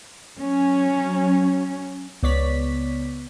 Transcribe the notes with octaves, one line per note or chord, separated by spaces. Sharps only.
F#3 C#4
C#2 B3 C#5 D5 B6